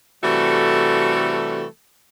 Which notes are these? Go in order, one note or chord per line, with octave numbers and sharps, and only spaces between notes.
C3 E3 G3 A3 F#4 A4